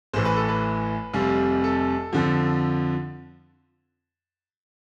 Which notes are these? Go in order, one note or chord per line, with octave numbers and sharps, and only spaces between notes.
A1 A2 E3 C5
B4
A4
B4
F1 F2 C3 G3
A4
F2 D3 F3